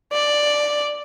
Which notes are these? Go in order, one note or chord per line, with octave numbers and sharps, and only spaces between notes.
D5